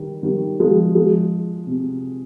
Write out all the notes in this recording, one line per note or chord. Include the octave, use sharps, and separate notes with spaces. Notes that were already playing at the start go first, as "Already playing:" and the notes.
Already playing: D#3 G3
D#3 G3
F3 G#3
F3 G#3
C3